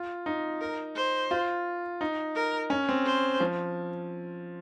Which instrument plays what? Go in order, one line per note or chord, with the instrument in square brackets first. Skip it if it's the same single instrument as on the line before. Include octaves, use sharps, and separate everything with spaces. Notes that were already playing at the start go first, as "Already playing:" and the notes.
Already playing: [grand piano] F4
D#4
[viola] A#4
C5
[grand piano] F4
D#4
[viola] A#4
[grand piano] C#4
C4
[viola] C5
[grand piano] F3